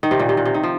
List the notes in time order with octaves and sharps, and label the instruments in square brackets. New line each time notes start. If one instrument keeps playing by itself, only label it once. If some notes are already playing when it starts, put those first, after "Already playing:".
[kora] D#3
C3
A#2
C3
A#2
C3
D#3
F3